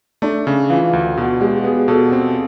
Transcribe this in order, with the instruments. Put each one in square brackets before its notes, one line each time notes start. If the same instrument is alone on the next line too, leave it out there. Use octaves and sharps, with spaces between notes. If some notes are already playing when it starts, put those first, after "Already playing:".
[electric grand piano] A3 [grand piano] D4
[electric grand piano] C#3
[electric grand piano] E3 [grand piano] F4
[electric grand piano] D2
[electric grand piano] B2 [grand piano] F#4
[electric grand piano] G#3 [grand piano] G4
[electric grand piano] B3 [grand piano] G#4
[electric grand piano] B2 [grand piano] A4
[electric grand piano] C4